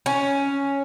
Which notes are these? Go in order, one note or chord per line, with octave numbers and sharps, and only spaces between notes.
C#4